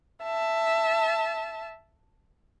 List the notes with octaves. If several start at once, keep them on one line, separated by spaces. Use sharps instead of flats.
E5 A5